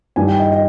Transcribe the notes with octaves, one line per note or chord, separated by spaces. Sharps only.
G2 D#3 G3 G#5
G5
D#5
D#5